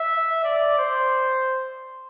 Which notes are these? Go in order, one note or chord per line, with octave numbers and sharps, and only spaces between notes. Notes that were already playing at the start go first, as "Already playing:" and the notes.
Already playing: E5
D5
C5